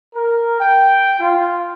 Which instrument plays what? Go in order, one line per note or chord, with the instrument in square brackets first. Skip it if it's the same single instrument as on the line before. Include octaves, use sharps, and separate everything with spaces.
[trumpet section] A#4
G5
F4